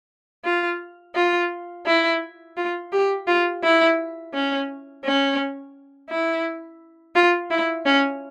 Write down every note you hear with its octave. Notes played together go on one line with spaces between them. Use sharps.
F4
F4
E4
F4
G4
F4
E4
C#4
C#4
E4
F4
E4
C#4